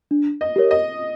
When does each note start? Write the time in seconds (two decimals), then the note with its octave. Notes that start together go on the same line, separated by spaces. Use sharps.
0.11 D4
0.41 D#5
0.56 G4 A#4 C#5
0.71 D#5